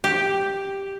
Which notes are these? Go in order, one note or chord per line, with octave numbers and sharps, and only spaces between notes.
G4